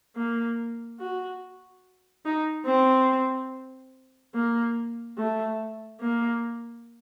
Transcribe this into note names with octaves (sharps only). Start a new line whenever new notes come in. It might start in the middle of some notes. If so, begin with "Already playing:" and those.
A#3
F#4
D#4
C4
A#3
A3
A#3